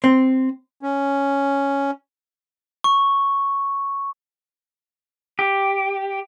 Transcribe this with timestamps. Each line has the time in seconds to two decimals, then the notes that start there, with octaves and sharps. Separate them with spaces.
0.04 C4
0.82 C#4
2.84 C#6
5.39 G4